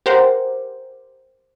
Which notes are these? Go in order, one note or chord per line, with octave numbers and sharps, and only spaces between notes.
G4 A#4 C5 F#5